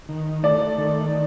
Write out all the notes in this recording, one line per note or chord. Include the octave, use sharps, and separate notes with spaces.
D#3
A3 D5
D#3